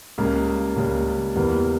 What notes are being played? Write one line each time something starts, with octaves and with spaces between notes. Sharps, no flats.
C#2 C#3 G3 A#3
C#2 C#3 G3 A#3
E2 E3 G3 A#3